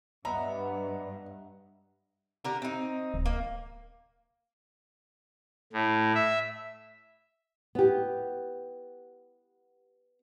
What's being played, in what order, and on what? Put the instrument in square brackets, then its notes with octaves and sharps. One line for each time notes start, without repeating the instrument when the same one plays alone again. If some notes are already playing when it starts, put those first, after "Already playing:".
[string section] G2 [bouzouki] B3 [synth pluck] D#5 E5 F#5 [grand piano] A#5
[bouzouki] D3 G4 A#4
C4 D#4
[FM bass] D1
[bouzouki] A#3
[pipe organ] A2
E5
[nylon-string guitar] B3 G4